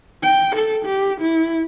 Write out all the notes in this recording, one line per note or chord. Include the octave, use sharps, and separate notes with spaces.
G5
A4
G4
E4